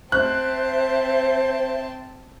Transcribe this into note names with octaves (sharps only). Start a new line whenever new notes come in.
C4 C5 E5 A5 F#6